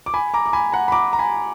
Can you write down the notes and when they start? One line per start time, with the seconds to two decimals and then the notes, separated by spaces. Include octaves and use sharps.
0.06 D6
0.14 G#5 B5
0.34 A#5 D6
0.46 D6
0.53 G#5 B5
0.72 F#5 A#5
0.88 B5
0.92 A#5 D6
1.13 A#5
1.19 G#5 B5